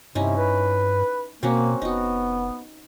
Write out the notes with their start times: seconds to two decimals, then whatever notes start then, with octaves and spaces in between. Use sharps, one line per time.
0.15 G2 C3 C#4 D#4 E4
0.37 B4
1.43 B2 A#3 C4 C#4 F#4
1.82 F1 B3 D#4 F#4